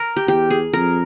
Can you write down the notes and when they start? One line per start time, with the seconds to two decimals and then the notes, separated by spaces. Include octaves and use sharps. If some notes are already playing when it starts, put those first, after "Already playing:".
Already playing: A#4
0.16 G4
0.28 E2 G4
0.50 G#4
0.73 F2 A#4